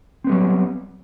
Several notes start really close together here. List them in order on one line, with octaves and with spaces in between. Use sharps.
C4 B3 G3 F#3